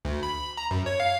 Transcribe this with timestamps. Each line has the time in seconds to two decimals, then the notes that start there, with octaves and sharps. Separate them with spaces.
0.05 D2
0.23 B5
0.57 A#5
0.71 F#2
0.86 C#5
1.00 F5